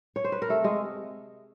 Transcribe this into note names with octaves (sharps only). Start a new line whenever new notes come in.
C#5
C5
B4
A#4
C3 A3 A4
G#3 G#4